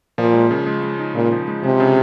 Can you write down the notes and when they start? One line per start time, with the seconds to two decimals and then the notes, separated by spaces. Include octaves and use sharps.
0.18 A#2 F3
0.34 G#3
0.51 C#3
0.67 G#3
0.83 G#3
0.99 D#4
1.15 A#2 C#3
1.32 F3
1.48 G#3
1.64 C3 G#3
1.80 C#3